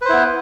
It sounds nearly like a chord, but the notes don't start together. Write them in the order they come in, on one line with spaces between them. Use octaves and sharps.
B4 C5 E4 B3